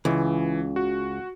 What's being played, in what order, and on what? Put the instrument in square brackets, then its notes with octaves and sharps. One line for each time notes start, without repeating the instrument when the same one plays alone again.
[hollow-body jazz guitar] C#2 [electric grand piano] E3
[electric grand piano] F#4